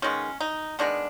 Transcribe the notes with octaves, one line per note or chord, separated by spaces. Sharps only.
D#3 G#3 B3 C#4
D#4
D#3 G#3 B3 D4